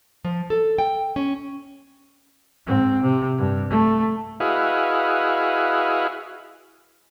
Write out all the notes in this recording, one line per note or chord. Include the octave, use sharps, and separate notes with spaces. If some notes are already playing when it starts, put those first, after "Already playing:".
F3
A4
G5
C#4
G#2 C4
C3
G2
A3
E4 F#4 G#4 B4 D#5 F5